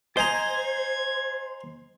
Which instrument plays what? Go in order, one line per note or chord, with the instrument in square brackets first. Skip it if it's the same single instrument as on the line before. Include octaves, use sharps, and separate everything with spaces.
[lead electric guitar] C5 [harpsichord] D#5 G#5 A#5 [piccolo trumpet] G#6